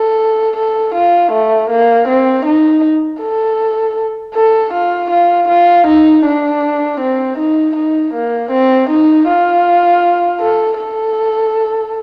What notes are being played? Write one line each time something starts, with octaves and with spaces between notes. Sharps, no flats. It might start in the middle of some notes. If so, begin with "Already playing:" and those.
Already playing: A4
A4
F4
A3
A#3
C4
D#4
A4
A4
F4
F4
F4
D#4
D4
C4
D#4
D#4
A#3
C4
D#4
F4
A4
A4